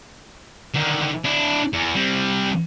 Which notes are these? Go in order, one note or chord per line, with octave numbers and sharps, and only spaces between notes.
D3 D#3
D4 E4
E2
G3 C4